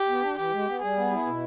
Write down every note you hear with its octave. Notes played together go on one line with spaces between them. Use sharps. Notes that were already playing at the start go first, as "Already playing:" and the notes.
Already playing: G4
B3
D4
E3 G4
G#3
B3
G3 G#4
B3
E4
B2